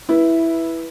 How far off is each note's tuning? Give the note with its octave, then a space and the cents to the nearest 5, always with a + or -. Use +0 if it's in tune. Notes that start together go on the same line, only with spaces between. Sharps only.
E4 +0 B4 -10 E5 +0